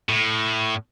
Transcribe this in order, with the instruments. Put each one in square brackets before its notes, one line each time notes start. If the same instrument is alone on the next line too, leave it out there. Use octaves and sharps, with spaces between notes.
[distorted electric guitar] A2